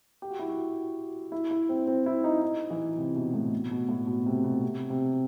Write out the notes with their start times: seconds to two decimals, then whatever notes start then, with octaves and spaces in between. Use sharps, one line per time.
0.22 G4
0.31 F#4
0.39 E4
0.49 F#4
1.32 E4
1.51 E4
1.69 C4
1.87 C4
2.06 E4
2.24 D#4
2.42 D#4
2.70 E3
2.97 C3
3.16 B2
3.34 A2
3.53 B2
3.71 B2
3.89 A2
4.07 B2
4.26 C3
4.44 B2
4.62 C3
4.90 C3